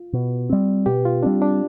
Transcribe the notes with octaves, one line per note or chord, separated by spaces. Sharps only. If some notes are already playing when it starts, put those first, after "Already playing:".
Already playing: F4
B2
G3 C4
B2 G4
F4
G3 C4 D4
D4